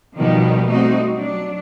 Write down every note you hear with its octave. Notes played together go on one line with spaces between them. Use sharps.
B2 D#3 F3 G3 B3 D#4
G3 A3 C4 D#4 F#4
F#3 D4